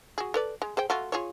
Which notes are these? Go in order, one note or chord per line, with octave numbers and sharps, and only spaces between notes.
F#4 G#4
A4 B4 D5
G#3
G#4 C5 G5
A3 F4 F#4
F4 G#4 C#5